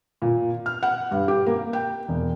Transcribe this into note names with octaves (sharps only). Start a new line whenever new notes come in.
A#2
F6
F#5
G2
G4
A#3
G5
E1